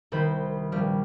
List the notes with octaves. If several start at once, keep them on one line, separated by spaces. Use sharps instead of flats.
C2 D#3 C5 B5
A#1 G3 F6